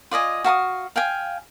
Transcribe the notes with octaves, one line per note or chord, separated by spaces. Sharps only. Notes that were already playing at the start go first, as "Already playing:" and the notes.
F4 D5 D#5 G#5
F#4 F5 A5 D#6
F5 G5 G#5